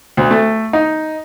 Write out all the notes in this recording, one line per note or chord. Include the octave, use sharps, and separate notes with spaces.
D2
A3
D#4